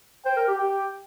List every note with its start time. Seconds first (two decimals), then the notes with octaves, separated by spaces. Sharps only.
0.26 C5 G5
0.37 A#4
0.48 G4
0.59 G4 G5